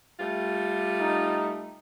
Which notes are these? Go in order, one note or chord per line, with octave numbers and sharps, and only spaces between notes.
G3 A3 F4
D#4